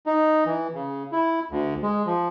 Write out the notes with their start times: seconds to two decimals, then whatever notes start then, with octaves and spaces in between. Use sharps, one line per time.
0.06 D#4
0.46 E3
0.75 C#3
1.12 E4
1.51 D2
1.83 G#3
2.06 F3